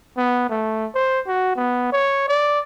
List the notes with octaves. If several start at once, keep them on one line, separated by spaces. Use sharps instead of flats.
B3
A3
C5
F#4
B3
C#5
D5